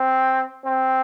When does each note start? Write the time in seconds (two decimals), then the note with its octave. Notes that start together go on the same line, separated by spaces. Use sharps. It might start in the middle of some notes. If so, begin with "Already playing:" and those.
Already playing: C4
0.65 C4